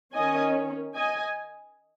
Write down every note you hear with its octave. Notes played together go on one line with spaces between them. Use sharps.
D#3 C#4 D#5 G#5
D#5 G#5